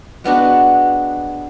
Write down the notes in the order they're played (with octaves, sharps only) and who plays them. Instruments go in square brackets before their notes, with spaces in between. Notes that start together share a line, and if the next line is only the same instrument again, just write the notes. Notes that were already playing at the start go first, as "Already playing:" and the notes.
[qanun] G#3 B3 D4 F#4